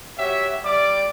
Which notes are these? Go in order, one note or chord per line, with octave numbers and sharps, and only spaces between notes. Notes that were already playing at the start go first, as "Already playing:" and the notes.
F#4 G4 C#5 E5
G3 D5 D6